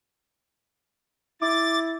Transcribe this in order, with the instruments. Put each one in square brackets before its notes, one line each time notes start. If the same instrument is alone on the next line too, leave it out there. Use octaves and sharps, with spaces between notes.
[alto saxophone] E4 [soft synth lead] D6 [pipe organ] A6